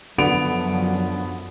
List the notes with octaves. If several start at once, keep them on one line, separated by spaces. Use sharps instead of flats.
F#2 D3 F3 F#3 B3 F#5 D7 F7